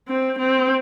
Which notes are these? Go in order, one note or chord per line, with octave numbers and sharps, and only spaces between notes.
C4
C4